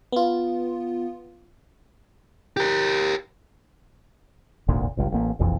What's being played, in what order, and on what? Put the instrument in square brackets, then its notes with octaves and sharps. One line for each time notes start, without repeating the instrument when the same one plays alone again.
[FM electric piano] B3 F4
[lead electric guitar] G4 A#4
[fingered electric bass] D#1 G#1 D2 A#2
G1 C#2 G2
A1 A#3
E1 A#1 F2 E3